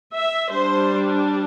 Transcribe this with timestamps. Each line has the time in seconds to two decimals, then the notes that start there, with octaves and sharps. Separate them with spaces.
0.14 E5
0.52 G3 D4 C5